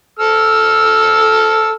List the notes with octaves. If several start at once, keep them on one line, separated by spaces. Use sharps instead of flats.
A4 E6 F6